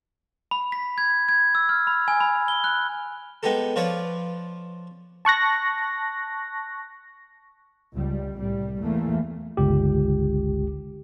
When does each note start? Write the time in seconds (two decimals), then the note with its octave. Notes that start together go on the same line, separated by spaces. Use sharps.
0.51 B5
0.72 B6
0.98 G#6
1.29 G#6
1.55 E6
1.69 F6
1.87 B5
2.08 G#5
2.20 B5
2.48 G7
2.64 F#6
3.43 G#3 B3 D#4 G4 A4
3.76 F3 F4 B4 C#5 D5
5.25 A5 C#6 F#6 A#6
7.93 C#2 G3
8.37 C2 A2 G3
8.82 E2 E3 A3 A#3
9.57 G1 C#2 G4